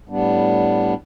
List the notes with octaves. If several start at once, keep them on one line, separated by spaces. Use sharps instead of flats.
A2 G3 B3 D4